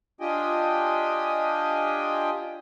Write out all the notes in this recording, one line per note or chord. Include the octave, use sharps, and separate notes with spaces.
D4 F4 G4 D#5 G5 G#5